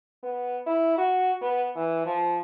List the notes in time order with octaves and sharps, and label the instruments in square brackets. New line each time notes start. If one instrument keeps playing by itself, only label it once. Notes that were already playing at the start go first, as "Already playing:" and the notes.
[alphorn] B3
E4
F#4
B3
E3
F3